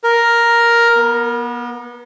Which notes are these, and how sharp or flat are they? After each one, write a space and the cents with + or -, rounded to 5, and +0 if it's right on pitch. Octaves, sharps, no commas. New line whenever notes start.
A#4 +5
B3 -35